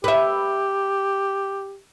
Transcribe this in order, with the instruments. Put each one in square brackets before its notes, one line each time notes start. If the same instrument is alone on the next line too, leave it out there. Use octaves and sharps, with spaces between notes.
[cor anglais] G4 [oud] B4 E5